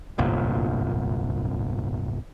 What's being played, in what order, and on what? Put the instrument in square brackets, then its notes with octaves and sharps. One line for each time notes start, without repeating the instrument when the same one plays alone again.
[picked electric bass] D1 G1 C2 A#2